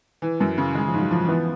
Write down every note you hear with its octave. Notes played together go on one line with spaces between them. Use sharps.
E3
F#2
C#3
D#3 G#3
F3
G#2
F#3
E3 F3
E3 B3